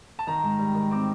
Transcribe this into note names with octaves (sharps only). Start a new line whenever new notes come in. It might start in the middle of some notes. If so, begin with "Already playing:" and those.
A5
D#3 A#5
G#2
G3
D#3
C4 D6